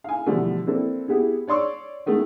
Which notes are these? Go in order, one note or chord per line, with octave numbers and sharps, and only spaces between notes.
F5 G#5
B2 D3 E3 F3 G3 A3
A#3 C4 D4 E4 A4
B3 E4 G4 G#4
C#5 D5 C6 C#6 E6
D#3 G#3 A3 B3